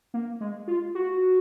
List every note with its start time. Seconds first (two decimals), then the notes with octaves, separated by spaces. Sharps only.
0.14 A#3
0.41 G#3
0.68 F4
0.95 F#4